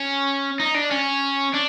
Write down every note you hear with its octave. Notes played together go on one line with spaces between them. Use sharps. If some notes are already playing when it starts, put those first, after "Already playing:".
Already playing: C#4
D#4
D4
C#4
D4